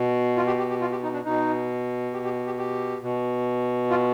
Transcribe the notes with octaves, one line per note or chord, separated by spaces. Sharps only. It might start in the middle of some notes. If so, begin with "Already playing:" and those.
Already playing: B2
F4
G4
G4
G4
F4
G4
D#4
D4
B2 D#4
G4
G4
G4
G4
B2
F4